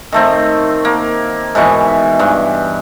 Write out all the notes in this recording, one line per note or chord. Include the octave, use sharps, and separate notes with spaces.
D#3 A3 C4
A#3
G#2 B2 E3 C#6
G2 E3